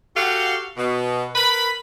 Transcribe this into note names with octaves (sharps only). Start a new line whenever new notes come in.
F#4 G4 A4 F5 F#5
B2
A#4 B4 B5